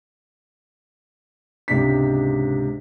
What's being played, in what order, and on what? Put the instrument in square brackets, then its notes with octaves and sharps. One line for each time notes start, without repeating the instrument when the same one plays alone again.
[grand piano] C#2 G#2 C3 D4 B6